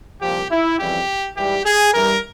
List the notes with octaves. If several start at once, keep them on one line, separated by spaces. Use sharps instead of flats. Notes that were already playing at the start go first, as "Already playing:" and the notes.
C2 A#2 F3 G4
E4
F2 C#3 E3 G3 G4
G#2 E3 G3 G4
G#4
G2 E3 G3 A#4